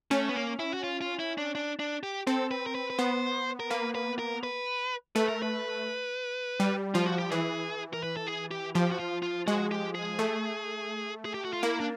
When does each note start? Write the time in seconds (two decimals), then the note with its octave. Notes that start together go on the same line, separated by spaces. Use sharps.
0.11 A3 C#4
0.29 B3
0.35 A#3
0.59 E4
0.74 F#4
0.84 F4
1.01 F4
1.19 E4
1.38 D4
1.55 D4
1.79 D4
2.03 G4
2.27 C4 A4
2.51 B4
2.66 A#4
2.75 B4
2.90 B4
2.99 B3 C5
3.60 A#4
3.71 A#3 B4
3.95 B4
4.19 A#4
4.43 B4
5.16 A3 B4
5.28 A#4
5.42 B4
6.60 G3
6.94 F3 F4
7.07 F#4
7.19 G4
7.31 E3 G#4
7.93 A#4
8.03 B4
8.17 A4
8.27 G#4
8.51 G4
8.75 F3 G4
8.91 F#4
8.99 F4
9.23 F4
9.47 G#3 F#4
9.71 G4
9.95 G#4
10.19 A3
11.25 G#4
11.34 G4
11.45 F#4
11.53 F4
11.63 A#3 E4
11.80 D4